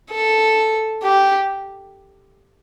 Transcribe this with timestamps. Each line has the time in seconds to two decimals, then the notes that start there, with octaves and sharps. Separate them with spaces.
0.11 A4
1.03 G4